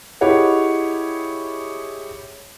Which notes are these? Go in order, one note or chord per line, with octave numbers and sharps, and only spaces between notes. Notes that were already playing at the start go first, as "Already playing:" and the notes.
E4 G4 G#4 C#5 D#5 F#5